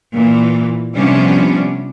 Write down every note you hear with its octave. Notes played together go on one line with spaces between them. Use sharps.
A#2 E3
C3 F3 G3 B3 C#4 D4